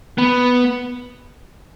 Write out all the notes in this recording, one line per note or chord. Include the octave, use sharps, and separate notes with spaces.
B3